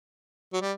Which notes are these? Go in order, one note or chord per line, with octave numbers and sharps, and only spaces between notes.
F#3
G3